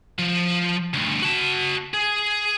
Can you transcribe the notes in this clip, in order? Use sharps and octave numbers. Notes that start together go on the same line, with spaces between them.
F3
D2 G2
F#4 A5
G#4